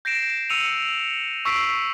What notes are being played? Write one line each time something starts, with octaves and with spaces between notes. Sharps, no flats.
G6 A#6 C7 D7 E7
E6 C#7 D#7 F7
C#6 E6 B6 C7 D7